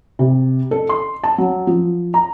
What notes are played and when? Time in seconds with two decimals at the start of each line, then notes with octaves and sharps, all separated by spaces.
0.19 C3
0.71 A4
0.89 C6
1.24 A5
1.38 F#3
1.67 F3
2.14 A#5